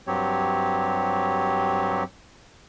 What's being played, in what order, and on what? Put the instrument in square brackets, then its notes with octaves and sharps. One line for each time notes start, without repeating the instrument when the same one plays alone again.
[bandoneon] G2 F#3 C4 G4 C#5